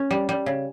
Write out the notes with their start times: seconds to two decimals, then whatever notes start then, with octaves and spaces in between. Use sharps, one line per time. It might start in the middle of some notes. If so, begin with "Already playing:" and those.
Already playing: C#4
0.11 G3
0.29 G3
0.46 C#3